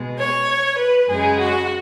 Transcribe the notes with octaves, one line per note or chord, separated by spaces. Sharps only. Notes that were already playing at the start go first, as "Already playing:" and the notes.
Already playing: B2 G#3
C#5
B4
F#2 C#3 G#3 G#4
F#4